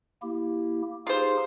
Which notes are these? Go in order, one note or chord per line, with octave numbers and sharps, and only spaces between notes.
A#3 E4 G4
D#4 F4 G4 G#4 C5